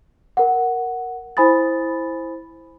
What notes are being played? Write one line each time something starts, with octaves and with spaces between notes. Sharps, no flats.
A#4 F#5
E4 C5 G#5 B5 D#6 A6